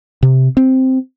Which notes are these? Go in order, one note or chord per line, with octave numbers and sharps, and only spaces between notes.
C3
C4